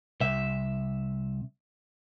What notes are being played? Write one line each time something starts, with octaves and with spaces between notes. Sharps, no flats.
C2 E5